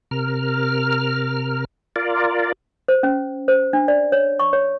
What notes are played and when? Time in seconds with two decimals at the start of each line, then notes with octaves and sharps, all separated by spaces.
0.11 C3 A#4 F6
1.96 F4 A#4 D5
2.88 C5
3.03 C#4
3.48 C5
3.73 D4
3.88 D5
4.12 C#5
4.39 C#6
4.53 C#5